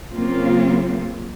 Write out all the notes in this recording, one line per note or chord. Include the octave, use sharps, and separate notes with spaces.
C#3 F#3 A#3 C4 F4